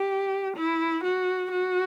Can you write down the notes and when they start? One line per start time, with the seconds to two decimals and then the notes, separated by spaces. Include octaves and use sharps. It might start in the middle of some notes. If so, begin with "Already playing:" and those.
Already playing: G4
0.57 E4
1.04 F#4
1.51 F#4